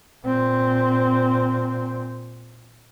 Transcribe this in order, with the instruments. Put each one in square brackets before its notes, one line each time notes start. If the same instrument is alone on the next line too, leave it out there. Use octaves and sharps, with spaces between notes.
[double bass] A#2 C4